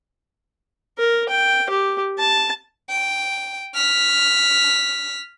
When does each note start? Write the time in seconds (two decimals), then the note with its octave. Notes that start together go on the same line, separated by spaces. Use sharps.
0.98 A#4
1.29 G5
1.70 G4
2.19 A5
2.90 G5
3.75 F6 B6